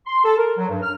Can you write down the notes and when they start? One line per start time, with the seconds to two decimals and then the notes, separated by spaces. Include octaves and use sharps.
0.06 C6
0.24 A4
0.37 A#4
0.57 F#3
0.69 G2
0.82 F6